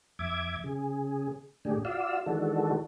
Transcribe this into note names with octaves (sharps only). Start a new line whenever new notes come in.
F2 E5 D6 G#6
C#3 G#4
A2 D3 D4 G4 G#4
F4 F#4 D5 F5 E6
D#3 E3 G#3 D4 F#4 A4